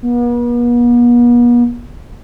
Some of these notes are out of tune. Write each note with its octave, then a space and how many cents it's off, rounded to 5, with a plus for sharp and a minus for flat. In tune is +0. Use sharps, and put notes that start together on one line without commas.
B3 -45